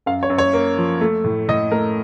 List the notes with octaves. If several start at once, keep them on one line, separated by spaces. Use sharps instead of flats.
F#2 F5
C#5
F#2
C#5
A#3
F3
A3
A2
A2 D#5
A3 A#4